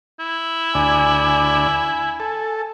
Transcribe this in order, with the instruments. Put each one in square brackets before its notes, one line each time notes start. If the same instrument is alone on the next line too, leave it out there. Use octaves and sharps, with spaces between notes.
[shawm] E4
[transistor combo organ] D2 D5 [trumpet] G#5
[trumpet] G#5
[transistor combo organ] A4